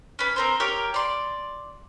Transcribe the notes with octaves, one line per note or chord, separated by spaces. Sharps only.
C#4 B4
C4 A#4 C5
G4 A#4 C#5
D5 C6